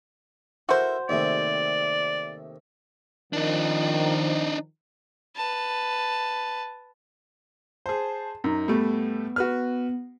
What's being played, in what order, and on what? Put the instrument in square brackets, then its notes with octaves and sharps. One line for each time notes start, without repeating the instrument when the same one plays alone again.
[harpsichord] E4 A4 A#4 [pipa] F#4 C5
[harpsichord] D#2 C3 A3 [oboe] D5
[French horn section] D#3 F3 [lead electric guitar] D4 D#4
[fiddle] B4 A5
[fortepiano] G#4 C5 [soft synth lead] A5
[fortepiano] F#2 [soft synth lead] D#4
[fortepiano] A2 G3 A3 [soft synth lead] B3
[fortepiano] F#4 B4 F6